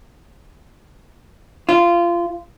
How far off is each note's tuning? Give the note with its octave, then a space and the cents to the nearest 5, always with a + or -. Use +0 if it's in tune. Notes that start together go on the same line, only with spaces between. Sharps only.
F4 -20